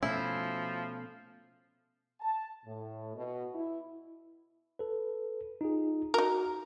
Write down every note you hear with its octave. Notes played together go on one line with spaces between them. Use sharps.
B2 F3 A3 C#4 E4
A5
A2
B2
E4
A4 B4
D#4 F4 G#4
D#4 F#4 A#4